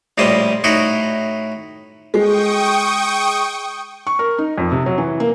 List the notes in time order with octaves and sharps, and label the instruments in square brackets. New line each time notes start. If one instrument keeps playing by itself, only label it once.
[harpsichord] A#1 A2 G3 A#3 C5 D#5
A2 D#4 E4 F#4 C6
[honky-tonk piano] G#3 [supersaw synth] G5 C#6 D#6
[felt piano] C#6
A#4
D#4
F2
C3
F#3
E3
A#3